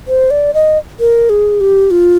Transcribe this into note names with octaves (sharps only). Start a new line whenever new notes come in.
C5
D5
D#5
A#4
G#4
G4
F4